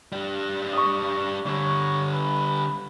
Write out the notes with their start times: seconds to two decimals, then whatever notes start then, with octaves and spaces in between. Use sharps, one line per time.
0.12 G3 D4
0.73 C#6 D#6
1.46 D3 G3 C#5
2.12 B4